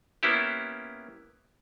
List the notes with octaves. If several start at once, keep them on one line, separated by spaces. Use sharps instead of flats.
A#3 B3 C#4 E4 G4